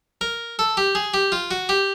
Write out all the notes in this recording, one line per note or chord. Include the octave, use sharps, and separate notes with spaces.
A#4
A4
G4
G#4
G4
F4
F#4
G4